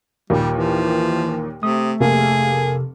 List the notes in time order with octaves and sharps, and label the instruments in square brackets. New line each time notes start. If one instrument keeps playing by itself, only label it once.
[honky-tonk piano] D#2 A#2 [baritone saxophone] G3
[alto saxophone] E3 [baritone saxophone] F3
[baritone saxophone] C3 [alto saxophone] A3 [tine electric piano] D#6
[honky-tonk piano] F1 A#3 A4 [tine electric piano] C3 [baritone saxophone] G#4